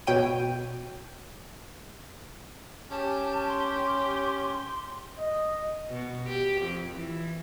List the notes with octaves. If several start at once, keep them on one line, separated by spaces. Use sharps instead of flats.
B2 C#5 G5 D#7
C#4 G4 A5
C6
D#5
B2
G4
F2
E3